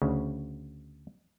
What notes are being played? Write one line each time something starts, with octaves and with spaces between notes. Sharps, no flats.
D2 C#3